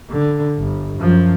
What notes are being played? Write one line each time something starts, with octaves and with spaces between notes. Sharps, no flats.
D3
G1
F#2 F3